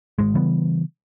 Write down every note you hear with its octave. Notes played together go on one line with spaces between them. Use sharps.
G#1 G#2 G#3
C#3 E3 G3 B3